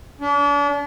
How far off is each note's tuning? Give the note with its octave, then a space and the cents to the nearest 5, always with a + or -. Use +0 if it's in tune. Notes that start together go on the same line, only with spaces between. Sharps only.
D4 -40